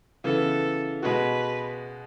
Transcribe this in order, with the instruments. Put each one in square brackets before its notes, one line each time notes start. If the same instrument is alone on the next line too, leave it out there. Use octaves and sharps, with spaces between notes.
[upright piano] C#3 E3 B3 [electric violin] A4
[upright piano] B2 G#3 B3 F#4 [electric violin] B4